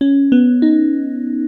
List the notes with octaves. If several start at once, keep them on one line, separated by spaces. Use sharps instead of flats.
C#4
B3
D#4